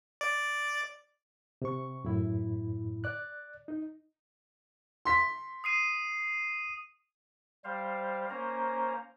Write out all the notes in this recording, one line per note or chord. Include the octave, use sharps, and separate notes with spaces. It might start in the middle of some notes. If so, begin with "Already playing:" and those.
D5
C3 C#6
F#2 A2 E4
D5 F#6
D#4
C6 B6
D#6 C7 D#7
G3 C5 F5
A#3 C#4 C5 A#5